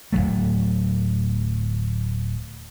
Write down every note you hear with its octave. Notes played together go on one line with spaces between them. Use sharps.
D1 F2 F#3 A3